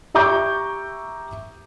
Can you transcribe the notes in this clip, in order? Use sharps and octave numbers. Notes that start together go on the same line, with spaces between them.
G4 E5 A#5 C#6 D6 G6